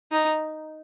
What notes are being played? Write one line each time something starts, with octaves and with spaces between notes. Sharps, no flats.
D#4